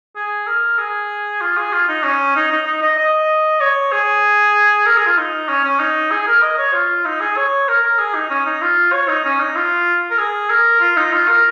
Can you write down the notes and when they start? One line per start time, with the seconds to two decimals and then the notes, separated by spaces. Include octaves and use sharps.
0.16 G#4
0.47 A#4
0.78 G#4
1.41 F4
1.57 G#4
1.73 F4
1.88 D#4
2.04 C#4
2.36 D#4
2.51 D#4
2.67 D#4
2.82 D#5
2.98 D#5
3.61 C#5
3.92 G#4
4.86 A#4
4.97 G#4
5.06 F4
5.18 D#4
5.49 C#4
5.64 C#4
5.80 D#4
6.11 G#4
6.27 A#4
6.42 D#5
6.58 C#5
6.74 F4
7.05 D#4
7.21 G#4
7.36 C#5
7.68 A#4
7.83 A#4
7.98 G#4
8.15 D#4
8.30 C#4
8.46 D#4
8.62 F4
8.92 C#5
9.08 D#4
9.25 C#4
9.40 D#4
9.56 F4
10.11 A#4
10.19 G#4
10.50 A#4
10.80 F4
10.97 D#4
11.13 F4
11.28 A#4